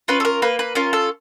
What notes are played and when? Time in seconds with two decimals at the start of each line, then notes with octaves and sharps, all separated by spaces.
0.08 C#4 F4 B4
0.20 A4
0.25 A#4
0.42 A#3 B4
0.59 B4
0.75 C#4 F4 A#4
0.93 A4